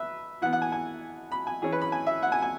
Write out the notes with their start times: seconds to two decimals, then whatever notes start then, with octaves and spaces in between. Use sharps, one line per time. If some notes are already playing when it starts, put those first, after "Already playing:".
Already playing: B4 E5
0.42 E3 F#5
0.45 B3
0.53 F#5
0.62 G#5
0.72 G#5
1.32 B5
1.47 G#5
1.62 E3 C#4 G#4
1.72 B4
1.81 B5
1.92 G#5
2.07 E5
2.23 F#5
2.32 G#5
2.42 G#5